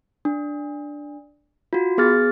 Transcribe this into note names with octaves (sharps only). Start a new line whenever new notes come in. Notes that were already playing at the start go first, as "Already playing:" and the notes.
D4
F4 F#4
B3 G#4 F6 A6